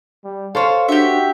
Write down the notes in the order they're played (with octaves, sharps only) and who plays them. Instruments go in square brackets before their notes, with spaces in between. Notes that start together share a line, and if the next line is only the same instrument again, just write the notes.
[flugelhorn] G3
[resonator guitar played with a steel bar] A4 C5 C#5 [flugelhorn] F5
[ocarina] D4 [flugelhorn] F#4 [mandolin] G4 E5